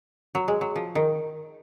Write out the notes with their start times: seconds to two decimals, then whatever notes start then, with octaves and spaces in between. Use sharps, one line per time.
0.35 F#3
0.48 G#3
0.61 F#3
0.76 F3
0.95 D#3